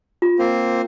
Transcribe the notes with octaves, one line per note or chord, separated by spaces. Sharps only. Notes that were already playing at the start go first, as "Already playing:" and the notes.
F4
A#3 C4 C5